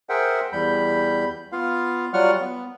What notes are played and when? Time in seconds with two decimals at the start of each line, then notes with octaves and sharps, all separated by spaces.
0.09 G#4 A#4 C5 E5 F#5 G5
0.53 E2 G3 B5 G6
1.52 B3 F4 F5
2.13 F#3 G3 F4 F#5 C#6 F6
2.40 B3